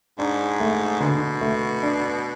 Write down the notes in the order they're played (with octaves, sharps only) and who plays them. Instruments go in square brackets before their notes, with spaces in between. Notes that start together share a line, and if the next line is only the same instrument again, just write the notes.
[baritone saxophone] G#2 [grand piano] D4
[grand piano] A3
[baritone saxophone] B2 [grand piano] D3
[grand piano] A3
D4